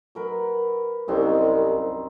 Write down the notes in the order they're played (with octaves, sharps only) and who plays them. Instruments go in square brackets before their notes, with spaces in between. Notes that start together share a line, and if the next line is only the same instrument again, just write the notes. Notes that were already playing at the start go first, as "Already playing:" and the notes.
[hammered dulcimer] F#3 A#4 B4
[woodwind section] C2 [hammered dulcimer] F#2 C4 D#4